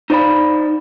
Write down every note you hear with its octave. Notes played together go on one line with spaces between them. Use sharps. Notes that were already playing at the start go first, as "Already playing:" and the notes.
D#4 C5 D5 F5 B5